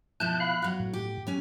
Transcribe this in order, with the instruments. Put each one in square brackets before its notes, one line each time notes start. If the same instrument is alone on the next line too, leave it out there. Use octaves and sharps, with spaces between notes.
[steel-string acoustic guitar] B2 F3 E4 [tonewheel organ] A5 F#6 G6
[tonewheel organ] F5 B5 F#6
[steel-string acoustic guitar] F#3 F#4
[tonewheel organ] A2
[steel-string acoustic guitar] G4
F#3 C#4 G#5